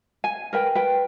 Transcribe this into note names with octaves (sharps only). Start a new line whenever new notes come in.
G#5
A#4 B4 G5
B4 G5